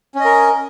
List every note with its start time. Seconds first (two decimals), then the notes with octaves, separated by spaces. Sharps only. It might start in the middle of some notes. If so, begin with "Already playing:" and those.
0.15 C#4
0.20 D#5
0.25 A#4